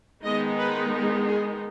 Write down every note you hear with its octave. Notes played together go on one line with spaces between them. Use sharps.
D#3 G#3 B3 D#4 D#5
B4
G#4